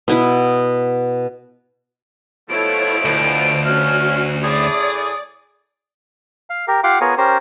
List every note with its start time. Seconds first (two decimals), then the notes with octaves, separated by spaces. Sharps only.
0.08 B2 B3 E4
2.50 B2 F3 A3 E4 A4 C#5 D7
3.05 D2
3.65 C#4 F#4 F6
4.43 A2 G#4 D5 D#6
6.50 F5
6.68 G4 A#4
6.84 F4 G4 F5 F#5 C6 D6
7.01 B3 F4 G#4 A#4 C#5 G#5
7.18 C#4 G4 A#4 C5